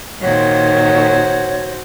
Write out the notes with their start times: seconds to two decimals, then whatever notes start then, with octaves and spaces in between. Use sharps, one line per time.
0.21 A#2 D#3 F#4 C5 C#5